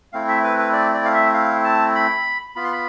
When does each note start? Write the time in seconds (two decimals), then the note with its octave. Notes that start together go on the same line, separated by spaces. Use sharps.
0.13 A3 C4 E4 F5
0.28 E5
0.44 B4
0.58 B4
0.73 D5
0.94 D5
1.05 F5
1.14 E5
1.34 F5
1.64 A5
1.95 B5
2.56 B3 F4 B5
2.64 C6
2.72 B5